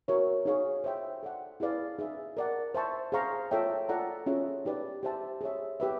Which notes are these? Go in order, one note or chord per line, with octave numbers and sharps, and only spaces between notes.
F#4 A#4 C#5 E5
D#4 G#4 C#5 F5
C5 E5 G5
A4 D5 F#5
E4 G#4 B4 D5 F5
D#4 G#4 B4 E5
A#4 D5 F#5
C5 E5 A5 C#6
G#4 C5 F5 A#5 C#6
F4 A4 C#5 E5 G5
F4 A4 D5 F#5 A#5
C#4 F4 G#4 C#5 E5
D#4 G4 B4 D5
G4 C5 E5 A5
G#4 C#5 E5
G4 B4 E5